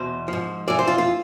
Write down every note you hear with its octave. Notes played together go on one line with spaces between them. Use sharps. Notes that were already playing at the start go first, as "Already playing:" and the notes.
Already playing: E2 B2 C5
G#2 F3
F2 E3 D5
C5
F4
F4